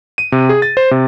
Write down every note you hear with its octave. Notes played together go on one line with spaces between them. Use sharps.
D#7
C3
G#4
A6
C5
C3